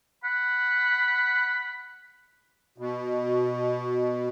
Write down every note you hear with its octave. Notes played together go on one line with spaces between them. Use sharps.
F#5 B5
B2